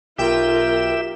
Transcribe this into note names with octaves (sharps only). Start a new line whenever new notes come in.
B1 F4 G4 A#4 E5 G5 E7